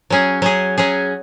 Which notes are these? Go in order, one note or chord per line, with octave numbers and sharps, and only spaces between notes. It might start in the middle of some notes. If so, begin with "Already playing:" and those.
F#3 C#4 G#4
F#3 C#4 G#4
F#3 C#4 G#4